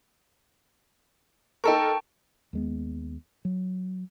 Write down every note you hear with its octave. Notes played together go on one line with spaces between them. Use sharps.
D#4 A4 A#4 G5 A5 C#6
D#2 G#3 B3
F#3